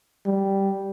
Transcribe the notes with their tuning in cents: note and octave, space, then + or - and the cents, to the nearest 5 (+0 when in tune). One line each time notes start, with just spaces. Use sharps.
G3 -5